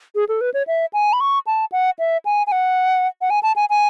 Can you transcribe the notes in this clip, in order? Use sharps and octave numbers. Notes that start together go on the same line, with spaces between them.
G#4
A4
B4
C#5
E5
G#5
B5
C#6
A5
F#5
E5
G#5
G#5
F#5
F#5
G#5
A5
G#5
G#5